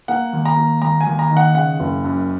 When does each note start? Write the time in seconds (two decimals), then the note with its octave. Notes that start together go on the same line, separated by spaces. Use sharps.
0.08 A#3 F#5
0.33 D#2
0.46 A#5
0.57 A#3
0.82 D#2 A#5
1.01 G#5
1.07 D#2
1.19 A#5
1.31 D#3
1.37 F#5
1.55 C#3 F#5
1.80 F#1
2.05 F#2